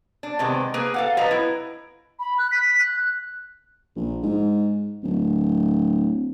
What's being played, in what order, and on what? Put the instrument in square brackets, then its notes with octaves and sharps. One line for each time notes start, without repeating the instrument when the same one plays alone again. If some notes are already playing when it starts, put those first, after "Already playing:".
[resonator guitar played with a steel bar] D4
C3 D#3 G#3 B3
A#3 G#4 B4
A4 F5 F#5
F3 B4 D#5 A#5
E4
[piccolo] B5
F#6
B6
F#6
[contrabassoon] A#1
G#2
D1